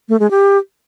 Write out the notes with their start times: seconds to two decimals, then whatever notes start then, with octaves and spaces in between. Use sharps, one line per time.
0.09 A3
0.20 G#3
0.31 G4